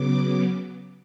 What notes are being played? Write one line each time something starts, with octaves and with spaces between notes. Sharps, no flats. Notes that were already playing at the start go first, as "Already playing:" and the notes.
Already playing: C#3 F#3 B3 D6